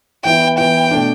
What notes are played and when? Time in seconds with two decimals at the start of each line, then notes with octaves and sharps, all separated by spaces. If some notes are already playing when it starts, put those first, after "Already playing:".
0.25 E3 B3 E4 G5
0.58 E3 B3 E4 G5
0.91 B2 A3 D4